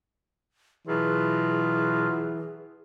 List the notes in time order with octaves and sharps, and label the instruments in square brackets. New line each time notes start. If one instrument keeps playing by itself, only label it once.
[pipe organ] B2 F#3 F4 [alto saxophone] E3 [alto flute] G#4